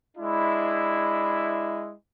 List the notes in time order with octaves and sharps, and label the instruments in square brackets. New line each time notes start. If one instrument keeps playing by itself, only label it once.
[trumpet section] G#3 D4 E4